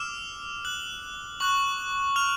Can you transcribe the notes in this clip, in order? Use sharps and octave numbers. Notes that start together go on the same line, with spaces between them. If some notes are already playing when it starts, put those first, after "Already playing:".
Already playing: D6 E6 F6 E7
F#6 F#7
C#6 F#6 F#7
F6 F7